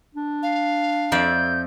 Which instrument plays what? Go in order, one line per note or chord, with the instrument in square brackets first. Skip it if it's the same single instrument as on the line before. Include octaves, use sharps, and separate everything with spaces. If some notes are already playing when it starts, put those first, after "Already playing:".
[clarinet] D4
[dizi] F5
[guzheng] F2 D5 E5 [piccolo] G6